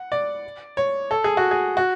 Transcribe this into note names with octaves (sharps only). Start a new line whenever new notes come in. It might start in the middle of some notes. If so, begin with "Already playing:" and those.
Already playing: F#5
D5
C#5
A4
G#4
F#4
G#4
F#4